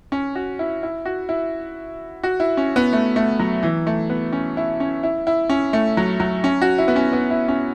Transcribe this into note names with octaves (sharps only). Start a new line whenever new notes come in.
C#4
F#4
E4
E4
F#4
E4
F#4
E4
C#4
B3
A3
A3
F#3
E3
A3
B3
C#4
E4
C#4
E4
E4
C#4
A3
F#3
F#3
C#4
F#4
E4
B3
C#4
B3
E4
C#4